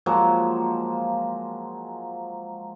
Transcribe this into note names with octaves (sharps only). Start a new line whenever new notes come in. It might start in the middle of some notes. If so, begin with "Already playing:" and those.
F3 F#3 G#3 A#3